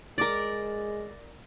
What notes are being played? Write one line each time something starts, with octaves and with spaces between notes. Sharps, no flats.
G#3 A#4 D5 D6 A6